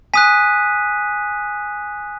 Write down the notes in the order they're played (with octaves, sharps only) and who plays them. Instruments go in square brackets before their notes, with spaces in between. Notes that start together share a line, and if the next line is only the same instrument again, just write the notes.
[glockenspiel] G#5 D#6 F#6 B6 D#7